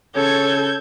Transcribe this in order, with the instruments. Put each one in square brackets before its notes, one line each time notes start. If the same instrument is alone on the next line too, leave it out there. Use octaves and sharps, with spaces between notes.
[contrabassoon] C#3 [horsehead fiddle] A4 [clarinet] C#5 [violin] G6 G#6